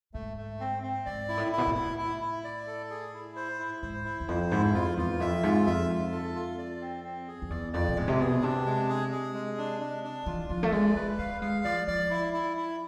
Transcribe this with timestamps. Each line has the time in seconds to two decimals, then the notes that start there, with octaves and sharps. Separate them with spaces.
0.14 G#2 A3
0.37 A3
0.60 C4
0.83 C4
1.06 G#2 D5
1.29 E4
1.37 A2
1.52 E4
1.58 B2
1.67 A2
1.75 E4
1.98 E4
2.21 E4
2.44 D5
2.67 A4
2.90 G#4
3.14 E4
3.36 C5
3.59 E4
3.82 G#2 C5
4.05 E4
4.20 E2
4.28 F2 C5
4.51 G#2 E4
4.74 F2 F4
4.97 E2 F4
5.20 F2 E5
5.43 G#2 F4
5.67 F2 E5
5.89 F4
6.12 A4
6.35 F4
6.58 D5
6.81 C4
7.04 C4
7.28 G#4
7.42 F2
7.50 E2 D5
7.73 F2 D5
7.89 B2
7.96 A2 G#3
8.08 C3
8.19 B2 G#4
8.42 C3 D4
8.66 G#3
8.89 G#4
9.12 G#4
9.34 G#3
9.58 D4
9.80 D4
10.04 D4
10.26 E3 F4
10.49 F3 F4
10.63 A3
10.72 G#3 D5
10.96 G#3 B4
11.19 A3 F5
11.41 G#3 F5
11.64 F3 D5
11.87 F3 D5
12.10 E4
12.33 E4
12.57 E4